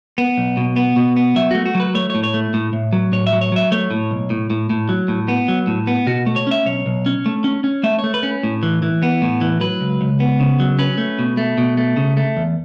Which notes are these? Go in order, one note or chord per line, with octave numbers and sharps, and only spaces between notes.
B3
B1
B2
B3
B2
B3
F#3 E5
A3 F#4
F#4
F#3
B4
A3 C#5
C#5
A2
C#5
A3
A2
A2
F#3
A2 C#5
E5
F#3
C#5
F#3 E5
A3 C#5
A2
B1
A2
A2
A2
F#3
A2
B3
F#3
A2
B3
B2 F#4
A3
C#5
C#4 E5
B1 C#5
B1
C#4
A3
C#4
C#4
A3 E5
C#5
A3
B4
C#4
A2
E3
E3
B3
A2
E3
F#3 B4
C#2
C#2
B3
C#3
F#3
C#4 B4
A3
B2
A3
B2
A3
C#3
A3
E2